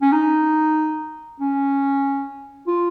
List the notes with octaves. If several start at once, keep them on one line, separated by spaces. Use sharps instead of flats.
C#4
D#4
C#4
F4